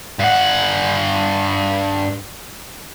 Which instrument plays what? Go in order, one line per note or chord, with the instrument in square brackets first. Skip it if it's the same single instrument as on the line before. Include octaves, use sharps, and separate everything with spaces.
[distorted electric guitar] G2 F#5